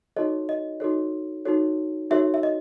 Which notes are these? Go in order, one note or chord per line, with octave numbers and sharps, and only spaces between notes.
D#4 F#4 A4 C#5 D#5
D#5
D#4 F#4 A4 C#5
D#4 F#4 A4 C#5
D#4 F#4 A4 C#5 E5
E5
D#5